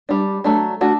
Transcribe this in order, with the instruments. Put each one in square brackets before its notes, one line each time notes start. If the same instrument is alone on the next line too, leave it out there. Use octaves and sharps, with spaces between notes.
[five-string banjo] G3 D4
F#3 A3 D4
A3 D4 F#4